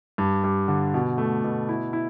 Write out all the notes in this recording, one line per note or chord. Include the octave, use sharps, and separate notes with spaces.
G2
G2
D3
B2
A3
B2
E4
E4